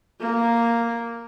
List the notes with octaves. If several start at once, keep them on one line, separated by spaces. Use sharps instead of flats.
A#3